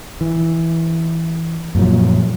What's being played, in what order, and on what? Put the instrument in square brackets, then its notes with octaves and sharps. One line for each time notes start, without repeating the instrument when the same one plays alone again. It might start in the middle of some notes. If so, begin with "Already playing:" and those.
[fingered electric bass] E3
F#2 A#2 F3 F#3